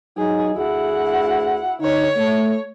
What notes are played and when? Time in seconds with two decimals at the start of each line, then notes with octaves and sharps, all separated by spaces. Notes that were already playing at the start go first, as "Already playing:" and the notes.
0.18 F#3 D#4 G#4
0.56 D2 E4 F#4 G#4 F#5
1.81 D3 D#4 C#5
2.17 A3